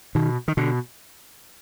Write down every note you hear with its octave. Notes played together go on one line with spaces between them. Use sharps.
B2 D#3
D#3
B2 D3